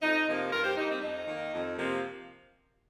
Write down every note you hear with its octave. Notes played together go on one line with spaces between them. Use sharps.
F2 D#4
C3 F3 A#3
G2 F4 A#4
G4 C5
G3 A#3 D#4
C4
F2 D#4
D#3 A#3
F2
C3 F3 A#3